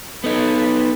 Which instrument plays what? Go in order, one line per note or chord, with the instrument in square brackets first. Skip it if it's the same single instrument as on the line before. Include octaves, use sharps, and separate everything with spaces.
[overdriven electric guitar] B3 D#4 [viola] A4 B4